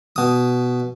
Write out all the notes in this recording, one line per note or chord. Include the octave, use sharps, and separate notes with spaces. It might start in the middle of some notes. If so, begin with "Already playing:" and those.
B2 D#6